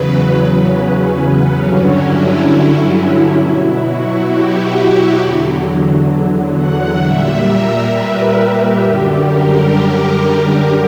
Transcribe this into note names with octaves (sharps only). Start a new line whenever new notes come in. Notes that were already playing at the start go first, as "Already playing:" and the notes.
Already playing: E2 C#3 F#3 B4
B4
C#4
G2 D3 F#3
E4
B2 F#3
F#4
G4
E2 D3 F#3
F#5
A#2 G3 E5
A#4
B4
G4
F#2 D3 G3 G4
A#4
A#4